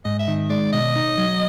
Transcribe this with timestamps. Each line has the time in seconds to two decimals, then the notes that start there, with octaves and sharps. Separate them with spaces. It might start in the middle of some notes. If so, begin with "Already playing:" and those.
0.05 G#2 D#5
0.19 E5
0.28 D#3
0.50 G#3 D5
0.73 B2 D#5
0.96 D#4
1.18 F#3